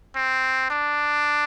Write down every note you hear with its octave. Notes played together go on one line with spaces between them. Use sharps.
C4
D4